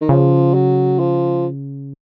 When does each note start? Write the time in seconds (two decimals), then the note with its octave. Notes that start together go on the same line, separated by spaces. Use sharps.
0.01 D#3
0.09 C#3 F3
0.54 F#3
0.99 F3